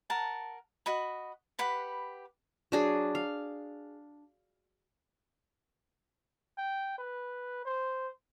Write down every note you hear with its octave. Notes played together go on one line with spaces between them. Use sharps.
A#4 F#5 A5
F#4 D#5 B5
G4 B4 F#5 B5
F#3 D4 G#4
F5
G5
B4
C5